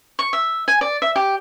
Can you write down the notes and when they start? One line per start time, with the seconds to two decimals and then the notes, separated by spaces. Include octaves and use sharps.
0.19 C#6
0.33 E5
0.68 G#5
0.81 D5
1.02 E5
1.16 G4